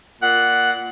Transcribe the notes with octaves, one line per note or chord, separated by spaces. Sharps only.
A#2 F#5